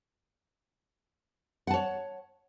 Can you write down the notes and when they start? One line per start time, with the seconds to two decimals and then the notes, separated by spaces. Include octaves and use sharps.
1.67 F#5
1.70 A5
1.74 C#5